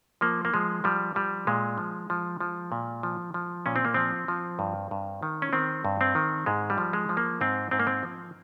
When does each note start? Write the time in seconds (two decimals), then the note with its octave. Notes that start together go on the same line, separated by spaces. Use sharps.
0.21 F3 A#3
0.45 A#3
0.54 F3 G#3
0.84 F3 G3
1.15 F3 G3
1.47 A#2 G#3
1.78 F3
2.10 F3
2.40 F3
2.72 A#2
3.03 F3
3.34 F3
3.66 A#2 C#4
3.76 C4
3.85 A#3
3.94 F3 C4
4.28 F3
4.59 G2
4.91 G2
5.23 D#3
5.42 C#4
5.53 D#3 C4
5.85 G2
6.01 C4
6.15 D#3
6.46 G#2 G#3
6.70 G3
6.78 F3
6.93 G#3
7.09 F3
7.17 A#3
7.41 G#2 C4
7.71 G#2 C4
7.80 A#3
7.87 C4
8.03 F3